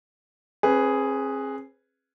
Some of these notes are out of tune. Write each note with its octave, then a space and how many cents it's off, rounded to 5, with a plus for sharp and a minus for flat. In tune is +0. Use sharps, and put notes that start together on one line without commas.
C4 +40 G#4 +0 B4 +0